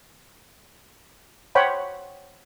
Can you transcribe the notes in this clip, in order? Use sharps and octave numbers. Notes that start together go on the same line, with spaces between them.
C5 C#5 F#5 G5 B5